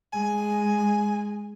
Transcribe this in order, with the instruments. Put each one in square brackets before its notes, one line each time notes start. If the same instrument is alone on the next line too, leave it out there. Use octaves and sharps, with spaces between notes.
[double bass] G#3 [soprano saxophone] G#5